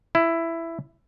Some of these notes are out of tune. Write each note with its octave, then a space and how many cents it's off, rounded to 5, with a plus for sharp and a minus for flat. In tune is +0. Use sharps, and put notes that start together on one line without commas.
E4 +10